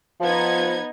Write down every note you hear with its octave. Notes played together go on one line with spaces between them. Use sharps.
F3 B3 D#4 G#6